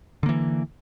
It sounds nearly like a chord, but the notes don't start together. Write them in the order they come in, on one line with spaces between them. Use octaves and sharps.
D3 A#3 E3